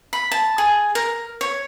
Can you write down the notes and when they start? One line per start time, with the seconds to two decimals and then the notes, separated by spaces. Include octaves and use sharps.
0.13 B5
0.31 A5
0.58 G#4
0.95 A#4
1.41 C#5